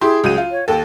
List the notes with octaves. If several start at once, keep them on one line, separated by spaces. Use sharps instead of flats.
E4 G4 G#4 C6
C#2 F#3 D#7
F4
C#5
D#2 A4 G5